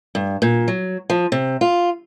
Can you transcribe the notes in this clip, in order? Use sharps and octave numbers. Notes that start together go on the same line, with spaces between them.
G2
A#2
F#3
F3
C3
F4